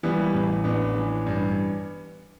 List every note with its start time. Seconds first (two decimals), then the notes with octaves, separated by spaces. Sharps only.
0.03 E3 G3 B3
0.34 A1
0.64 A1 B3 D4
0.95 E3
1.26 G2